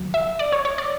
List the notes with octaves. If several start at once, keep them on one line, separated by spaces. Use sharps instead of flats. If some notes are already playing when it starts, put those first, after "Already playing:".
Already playing: D2 F#3
E5
D5
C#5
C#5
D5